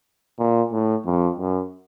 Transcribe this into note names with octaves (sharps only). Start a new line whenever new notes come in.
A#2
A2
F2
F#2